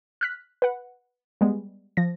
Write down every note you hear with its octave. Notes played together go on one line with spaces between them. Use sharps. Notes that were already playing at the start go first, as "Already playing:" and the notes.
F6 F#6 B6
B4 F#5
G3 G#3 B3
F3 A#6